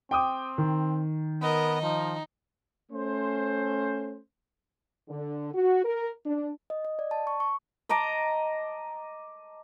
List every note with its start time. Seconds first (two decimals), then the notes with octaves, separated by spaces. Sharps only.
0.11 C4 G5 D6 D#6
0.58 D#3
1.42 B3 A#4 D#5
1.82 F3 D#4
2.92 A3 C#4 C5
5.09 D3
5.54 F#4
5.83 A#4
6.26 D4
6.70 D#5
6.85 D#5
6.99 D5
7.11 A5
7.27 C#6
7.40 C#6
7.89 D#5 A5 A#5 D6